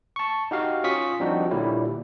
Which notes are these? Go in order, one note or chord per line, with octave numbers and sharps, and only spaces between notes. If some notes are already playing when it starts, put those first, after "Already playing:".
A5 C#6
D#4 F#4 G4 F5
C#4 F4 C#6 D#6 B6
F3 G3 C4 D4 D#4 F#4
A#2 D3 G3 E4 C#5